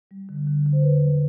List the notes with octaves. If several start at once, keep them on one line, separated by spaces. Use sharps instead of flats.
G3
D3
D3
D3
C5
E2 B4
F#3